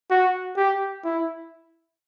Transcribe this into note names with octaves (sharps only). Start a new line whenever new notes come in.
F#4
G4
E4